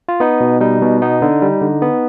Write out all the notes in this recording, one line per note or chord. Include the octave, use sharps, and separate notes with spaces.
F4
B3 D#4
B2
G3 D#4
B2
B3 D#4
D3
G3
D3
B3